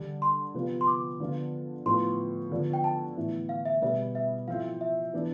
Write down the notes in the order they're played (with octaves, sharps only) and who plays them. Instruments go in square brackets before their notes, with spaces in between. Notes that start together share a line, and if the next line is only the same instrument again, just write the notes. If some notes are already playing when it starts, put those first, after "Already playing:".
Already playing: [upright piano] D3 G3 D4
[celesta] C6
[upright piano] C3 F3 B3 F4
[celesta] C6
D6
[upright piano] D3 F3 B3 F4
[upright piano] A2 F3 B3 [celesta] C6
[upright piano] D3 F3 B3 D4
[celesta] G5
A5
[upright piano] A2 E3 B3 E4
[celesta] F5
E5
[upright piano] B2 G3 B3 [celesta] E5
[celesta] E5
[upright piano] F3 C4 E4 [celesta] F5
[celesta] E5
[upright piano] E3 B3 D4